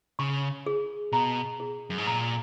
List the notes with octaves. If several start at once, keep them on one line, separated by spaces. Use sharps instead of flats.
C#3 C#6
G#4
B2 A#5
G#4
F#2
G#2
A#2 A#5